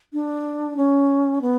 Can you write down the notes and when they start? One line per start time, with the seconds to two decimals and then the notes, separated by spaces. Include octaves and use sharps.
0.13 D4
0.77 C#4
1.42 B3